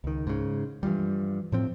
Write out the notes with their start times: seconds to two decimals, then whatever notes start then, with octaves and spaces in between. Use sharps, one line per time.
0.04 C#2 D#3
0.27 G#2 C#3
0.83 G2 E3 F3 G3
1.52 A2 F3 C4